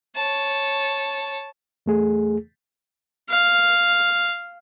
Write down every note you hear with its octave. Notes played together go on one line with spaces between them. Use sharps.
C#5 A5
E2 A3 G#4
F5